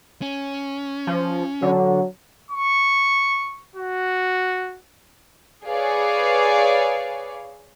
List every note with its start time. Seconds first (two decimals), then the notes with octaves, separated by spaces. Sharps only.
0.22 C#4
1.07 F3
1.62 D3 F#3
2.51 C#6
3.76 F#4
5.65 G#4 B4 C#5 D5 F5